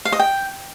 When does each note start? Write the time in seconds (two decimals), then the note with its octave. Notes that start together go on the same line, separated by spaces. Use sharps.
0.05 F5
0.12 D#5
0.19 G5